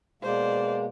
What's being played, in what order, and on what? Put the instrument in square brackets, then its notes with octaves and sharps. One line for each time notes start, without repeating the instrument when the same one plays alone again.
[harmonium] B2 G#3 A#3 [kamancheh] C5 D5